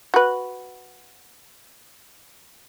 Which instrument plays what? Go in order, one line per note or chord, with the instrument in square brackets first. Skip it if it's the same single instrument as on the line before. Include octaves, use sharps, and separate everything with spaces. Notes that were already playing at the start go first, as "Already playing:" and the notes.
[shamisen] F#4 B4